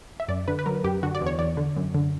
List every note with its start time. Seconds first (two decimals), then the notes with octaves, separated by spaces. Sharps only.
0.20 E5
0.28 F#2 D5
0.48 D3 B4
0.59 B4
0.66 F#3 A#4
0.84 F#2 G4
1.03 D3 F#4
1.15 D5
1.21 E2
1.26 C#5
1.39 E2 D5
1.57 D3
1.76 F#2
1.95 D3